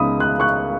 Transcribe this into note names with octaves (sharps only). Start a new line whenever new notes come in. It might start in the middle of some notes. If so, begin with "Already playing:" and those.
Already playing: C#2 C#3 B3 D#4 B5 D#6
F#6
C#6 F#6